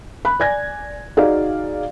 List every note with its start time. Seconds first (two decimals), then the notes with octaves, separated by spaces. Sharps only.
0.25 B5 F#6
0.40 D5 G#5 G#6 A#6
1.17 D#4 F#4 G#4 D5 F5